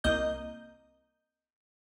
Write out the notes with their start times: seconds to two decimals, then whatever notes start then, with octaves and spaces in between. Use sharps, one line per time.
0.04 C2 A#3 D#5 G6